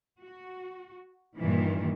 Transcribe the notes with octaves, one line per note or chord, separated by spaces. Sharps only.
F#4
G2 A#2 D#3 E3